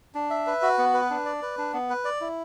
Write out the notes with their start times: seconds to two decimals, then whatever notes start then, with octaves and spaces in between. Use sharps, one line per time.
0.15 D4
0.30 E5
0.47 B4
0.62 F#4
0.78 B3
0.94 B4
1.10 D4
1.25 D5
1.42 B4
1.58 D4
1.73 B3
1.90 B4
2.05 D5
2.21 E4